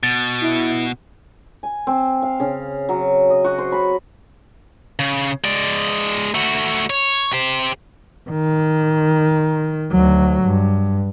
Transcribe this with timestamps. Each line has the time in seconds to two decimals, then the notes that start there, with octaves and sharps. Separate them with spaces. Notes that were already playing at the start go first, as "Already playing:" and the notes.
0.03 B2 A6
0.41 E4
1.63 G#5
1.87 C4
2.22 F5
2.40 C#3
2.89 F#3
3.30 D#5
3.44 F#4
3.58 C5
3.72 B5
4.99 C#3
5.44 G#3 D5
6.34 A3 F#4
6.90 C#5
7.33 G4 C5
8.30 D#3
9.92 D2 F#3
10.44 G2